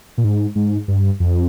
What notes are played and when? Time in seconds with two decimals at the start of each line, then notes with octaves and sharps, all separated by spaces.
0.18 A#2
0.24 G#2
0.55 G#2
0.88 G2
1.20 F2